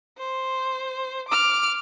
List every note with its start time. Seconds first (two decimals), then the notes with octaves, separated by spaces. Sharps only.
0.18 C5
1.29 D6 F6